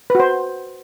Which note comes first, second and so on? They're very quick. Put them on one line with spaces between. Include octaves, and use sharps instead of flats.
B4 F#4 C5